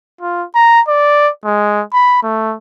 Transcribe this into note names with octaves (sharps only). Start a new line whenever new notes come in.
F4
A#5
D5
G#3
B5
A3